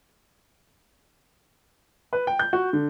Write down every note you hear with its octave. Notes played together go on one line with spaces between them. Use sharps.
B4
G5
G6
F#4
D3